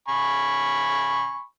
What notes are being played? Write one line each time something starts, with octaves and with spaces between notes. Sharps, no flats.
G#5 B5 C#6